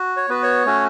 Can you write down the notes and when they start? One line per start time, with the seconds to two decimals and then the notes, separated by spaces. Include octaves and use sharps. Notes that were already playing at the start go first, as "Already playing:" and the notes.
Already playing: F#4
0.17 C#5
0.29 B3 F#4 B4
0.43 C#5
0.66 A3 C#4 F#4